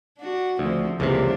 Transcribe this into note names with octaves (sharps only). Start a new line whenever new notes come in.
D4 F#4
D2 C#3 F3 C4
C#2 F#2 C3 E3 A#3 D4